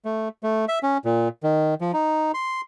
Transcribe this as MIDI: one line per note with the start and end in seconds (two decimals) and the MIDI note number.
0.05 0.28 57
0.43 0.65 57
0.68 0.79 76
0.83 0.98 61
1.05 1.28 46
1.43 1.74 51
1.81 1.92 53
1.93 2.32 63
2.34 2.61 84